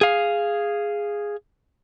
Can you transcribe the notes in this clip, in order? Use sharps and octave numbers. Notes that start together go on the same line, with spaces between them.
G#4 F5